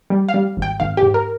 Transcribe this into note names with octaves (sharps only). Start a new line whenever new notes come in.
G3
F5
G3
G#1
G5
G#1 F5
G4
G#2
A#4